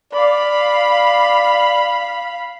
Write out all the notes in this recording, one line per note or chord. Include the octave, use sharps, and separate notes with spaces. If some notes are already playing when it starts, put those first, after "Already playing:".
D5 F5 B5